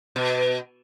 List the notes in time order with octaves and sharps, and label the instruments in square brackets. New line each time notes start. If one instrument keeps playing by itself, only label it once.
[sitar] B2